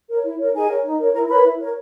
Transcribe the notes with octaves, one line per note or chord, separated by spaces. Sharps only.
A#4 C#5
E4
A#4 C#5
D#4 G#4 G#5
A#4 C#5
D#4
A#4 C#5
E4 A#4 A#5
A#4 B4 C#5 B5
E4
A#4 C#5